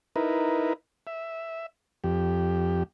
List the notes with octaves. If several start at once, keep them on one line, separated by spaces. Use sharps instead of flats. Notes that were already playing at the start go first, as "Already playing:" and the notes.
D#4 E4 A#4 B4
E5
F2 G4